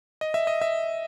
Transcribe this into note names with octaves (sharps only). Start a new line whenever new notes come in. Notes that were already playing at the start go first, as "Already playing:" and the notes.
D#5
E5
D#5
E5